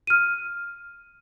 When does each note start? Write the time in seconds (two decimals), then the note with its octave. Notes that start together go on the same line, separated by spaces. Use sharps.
0.07 F6 D#7